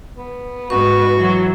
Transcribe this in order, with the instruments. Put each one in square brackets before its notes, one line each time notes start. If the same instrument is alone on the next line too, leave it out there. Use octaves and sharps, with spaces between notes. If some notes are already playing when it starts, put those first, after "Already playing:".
[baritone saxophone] B3
[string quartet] G#2 B3 [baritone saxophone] F#4 [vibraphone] C#6
[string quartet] E3 F#3